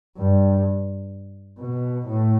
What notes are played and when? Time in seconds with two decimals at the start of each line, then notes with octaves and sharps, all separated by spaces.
0.17 G2
1.59 B2
2.06 A2